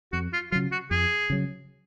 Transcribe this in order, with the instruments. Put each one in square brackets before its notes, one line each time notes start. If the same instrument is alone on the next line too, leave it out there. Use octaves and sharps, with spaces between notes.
[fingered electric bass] F2 [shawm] F#4
[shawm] F4
[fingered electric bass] C#3 F#3 [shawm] F4
[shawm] F#4
[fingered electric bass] F2 [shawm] G#4
[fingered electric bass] C#3 F#3